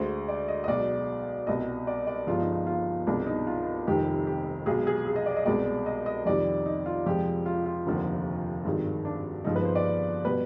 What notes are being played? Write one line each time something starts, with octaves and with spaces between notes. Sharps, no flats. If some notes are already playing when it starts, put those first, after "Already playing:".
Already playing: D2 D3 G#3 C5
D5
D#5
D#5
B1 B2 G#3 D5
C2 B2 G3 D#5
D5
D5
G1 G2 F3 G#3 F4
D#4
D#4
F4
C2 B2 G#3 D4
D#4
F4
F1 F2 D#3 G3 G4
G4
B1 B2 G#3 G#4
G#4
G#4
D#5
D5
D#5
C2 B2 G#3 D5
D#5
D#5
F2 C3 D#3 G3 D5
D#4
F4
F2 C3 F3 G#3 G4
F4
F4
F1 D#2 D3 F3
G#1 G2 D#3 G#3
D4
G1 G2 F3 G#3 D#4
B4
C5
D5
B2 G3 B4